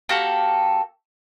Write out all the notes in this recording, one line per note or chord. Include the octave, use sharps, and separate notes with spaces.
A#3 F#4 G4 A4